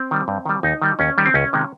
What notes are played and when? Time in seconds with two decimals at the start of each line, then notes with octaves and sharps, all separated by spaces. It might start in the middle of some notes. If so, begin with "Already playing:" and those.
Already playing: C4
0.11 D#3 G3
0.28 G2
0.45 D#3 G3
0.63 D#2 D#4
0.82 D#3 G3
0.99 D#2 C#4
1.18 D#3 G3
1.26 C4
1.34 C#2 C#4
1.53 C3 D#3 G#3